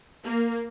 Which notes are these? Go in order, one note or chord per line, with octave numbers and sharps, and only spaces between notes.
A#3